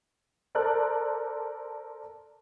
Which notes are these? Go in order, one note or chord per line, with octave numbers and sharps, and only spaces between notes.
A4 A#4 C5 D5 F#6